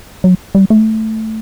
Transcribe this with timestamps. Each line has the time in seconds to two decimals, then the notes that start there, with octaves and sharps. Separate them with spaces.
0.24 F#3
0.55 G3
0.70 A3